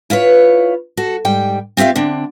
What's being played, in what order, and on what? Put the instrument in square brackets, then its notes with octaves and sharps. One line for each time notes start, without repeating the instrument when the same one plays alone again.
[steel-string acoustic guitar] E4 F4 B4 C#5
F#4 A4
G#2 G3 G5
C4 F4 G4 E5 F5
D3 C4 D4